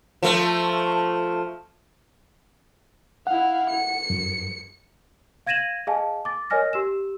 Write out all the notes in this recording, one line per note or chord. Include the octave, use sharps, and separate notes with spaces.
F3 A3
E4 F5 F#5
C#7
F#2
F5 G#6 A#6 D#7 E7 F#7
G#4 D#5 F5 G#5 A5
D6 A6
A#4 C#5 D#5 G#5 F6 A#6
G4 E6 E7